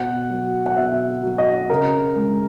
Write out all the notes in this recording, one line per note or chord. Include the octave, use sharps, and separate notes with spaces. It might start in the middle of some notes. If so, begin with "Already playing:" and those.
Already playing: B2 F#5
F#3
F#5
B2 E5
F#3
D#5
C#3 A#4
G#3